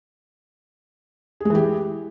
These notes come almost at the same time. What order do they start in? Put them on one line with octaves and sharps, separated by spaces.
G#4 G#3 E3 G4